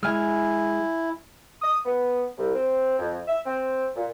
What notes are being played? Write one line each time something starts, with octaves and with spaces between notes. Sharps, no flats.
G#3 E4 G#5 F6
D#6
B3
C2
C4
F2
E5
C4
A#2